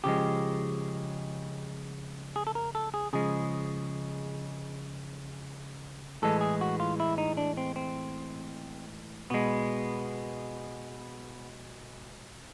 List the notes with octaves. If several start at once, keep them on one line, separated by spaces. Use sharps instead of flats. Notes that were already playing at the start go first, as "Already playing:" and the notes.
C#3 F3 G#3 G4
G#4
A4
A#4
A4
G#4
C#3 F3 G#3 G#4
A2 E3 G#3 A4
G#4
F#4
F4
E4
D#4
D4
C4
C4
B2 G#3 B3